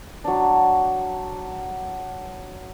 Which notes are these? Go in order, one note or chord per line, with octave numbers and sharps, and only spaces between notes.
F#3 D4